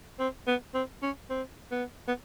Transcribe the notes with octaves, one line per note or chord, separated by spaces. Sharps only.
C4
B3
C4
C#4
C4
B3
B3